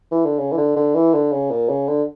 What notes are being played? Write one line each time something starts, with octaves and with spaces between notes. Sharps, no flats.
E3
D3
C#3
E3
D3
D3
E3
D3
C#3
A#2
C#3
D3